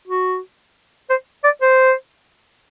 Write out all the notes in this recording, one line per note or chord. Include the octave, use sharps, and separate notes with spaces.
F#4
C5
D5
C5